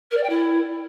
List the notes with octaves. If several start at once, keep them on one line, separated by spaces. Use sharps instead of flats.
A#4
D5
G5
E4